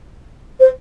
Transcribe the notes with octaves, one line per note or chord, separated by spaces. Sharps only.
C5